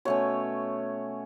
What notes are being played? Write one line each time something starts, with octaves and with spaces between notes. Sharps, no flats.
B2 A3 C#4 C#5